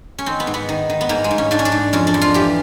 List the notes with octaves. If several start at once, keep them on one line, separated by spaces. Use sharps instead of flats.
C#4
D#3 C4
B3
G#2
B3
D#3
D#3
B3
G#2 A#3
G#3
G#2
C#4
G#2 D4
C#4
D4
G#2
F2 C#4
D4
F2
F4
E3 G4